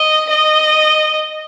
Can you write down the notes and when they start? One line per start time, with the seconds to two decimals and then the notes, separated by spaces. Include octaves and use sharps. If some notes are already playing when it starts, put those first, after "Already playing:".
Already playing: D#5
0.31 D#5